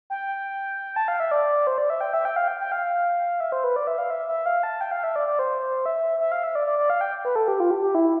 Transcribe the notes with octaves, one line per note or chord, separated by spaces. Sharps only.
G5
A5
F5
E5
D5
C5
D5
E5
G5
E5
G5
F5
G5
G5
F5
E5
C5
B4
D5
E5
F5
E5
E5
F5
A5
G5
F5
E5
D5
D5
C5
E5
E5
F5
E5
D5
D5
D5
F5
G5
B4
A4
G4
F4
G4
G4
E4